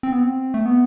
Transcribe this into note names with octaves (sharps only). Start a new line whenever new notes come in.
C4
B3
C4
A3
B3